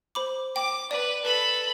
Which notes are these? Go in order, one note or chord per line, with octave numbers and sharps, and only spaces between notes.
C5 B5 D6
G5 D6
B4 D5
A4 B4 B5